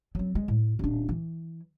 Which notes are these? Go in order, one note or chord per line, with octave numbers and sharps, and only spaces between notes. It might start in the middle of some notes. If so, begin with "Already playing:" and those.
F#3 C4
G#3
A2
D#1 D4
E3